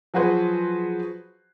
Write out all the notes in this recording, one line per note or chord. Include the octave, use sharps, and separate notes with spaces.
F3 F#3 F#4 G#4 B4 C5